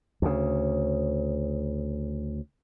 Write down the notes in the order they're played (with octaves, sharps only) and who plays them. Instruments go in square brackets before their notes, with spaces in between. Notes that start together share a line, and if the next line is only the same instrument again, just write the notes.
[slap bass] D2 C#3